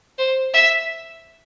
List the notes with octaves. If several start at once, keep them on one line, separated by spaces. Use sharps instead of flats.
C5
E5